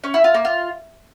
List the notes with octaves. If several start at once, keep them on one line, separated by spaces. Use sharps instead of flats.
C#4
E4
F4
A#3
F4